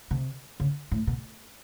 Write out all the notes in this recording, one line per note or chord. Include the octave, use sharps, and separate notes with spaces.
C3
C#3
A2
B2